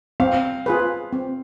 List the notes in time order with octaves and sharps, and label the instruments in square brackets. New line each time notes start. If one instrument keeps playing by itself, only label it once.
[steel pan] C4 [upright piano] F5
[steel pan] F4 G#4 B4
C4